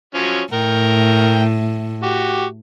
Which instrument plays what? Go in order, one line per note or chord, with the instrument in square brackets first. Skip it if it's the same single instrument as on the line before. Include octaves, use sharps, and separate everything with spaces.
[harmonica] F3 F#3 C#4
[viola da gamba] A2 [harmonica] A#4 G5
[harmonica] F#4 G4